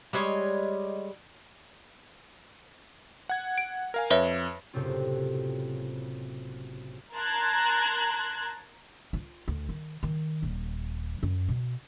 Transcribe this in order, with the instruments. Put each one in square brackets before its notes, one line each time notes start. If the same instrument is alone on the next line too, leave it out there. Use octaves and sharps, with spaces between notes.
[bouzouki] G3 G#3 C#5 D#5
[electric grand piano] F#5 G#6
[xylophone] D7
[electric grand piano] A#4 F5 G#5
[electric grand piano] F2 [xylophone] B4 C#5 E5
[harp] F#1 A2 C3 C4 F4
[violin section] A#4 A5 A#5 C6 F#6 G#6
[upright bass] F4
D2
D#3
D#3
D#1
F#2
B2